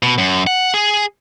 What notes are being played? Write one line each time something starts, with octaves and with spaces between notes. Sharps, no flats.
B2
F#2
F#5
G#4